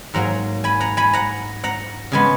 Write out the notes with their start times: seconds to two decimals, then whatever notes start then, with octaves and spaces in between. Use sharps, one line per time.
0.14 G#2 F#3 A#3 F#5 A#5
0.64 G#5 B5
0.80 F#5 A#5
0.97 G#5 B5
1.13 F#5 A#5
1.64 F#5 A#5
2.12 C#3 G#3 B3 G#5 B5